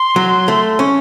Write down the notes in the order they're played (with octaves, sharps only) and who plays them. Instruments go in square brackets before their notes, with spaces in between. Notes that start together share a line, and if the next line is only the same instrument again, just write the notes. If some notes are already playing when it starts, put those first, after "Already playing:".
Already playing: [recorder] C6
[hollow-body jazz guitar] F#3
A3
C#4